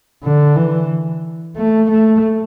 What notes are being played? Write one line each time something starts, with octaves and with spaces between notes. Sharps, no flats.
D3
E3
A3
A3